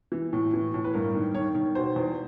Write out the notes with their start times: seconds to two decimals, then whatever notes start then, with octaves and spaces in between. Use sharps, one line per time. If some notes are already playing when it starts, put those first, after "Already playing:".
0.12 E3
0.33 A2
0.54 E3
0.74 A2
0.84 B4
0.94 G2 A#4
1.15 D#3
1.34 D#3 C#5
1.55 D#3
1.75 B2 C5
1.96 E2